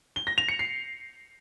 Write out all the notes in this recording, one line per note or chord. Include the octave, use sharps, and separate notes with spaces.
G7
A#6
F7
C#7
C7